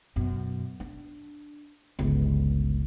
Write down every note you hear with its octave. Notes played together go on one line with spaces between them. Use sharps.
F#2 B2
D4
G1 C#2